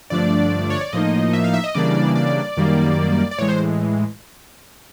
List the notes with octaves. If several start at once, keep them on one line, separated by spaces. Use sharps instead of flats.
G2 D3 F3 A3 D4 D5
C#5
D5
A2 F3 A#3 D#4 D#5
E5
F5
E5
D#5
C#3 E3 G3 A#3 D4 D5
D5
F#2 D#3 G3 A#3
D5
A2 E3 G#3 C#5
C5